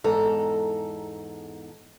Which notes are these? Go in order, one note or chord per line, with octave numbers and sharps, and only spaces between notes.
E2 G#2 A4 A#5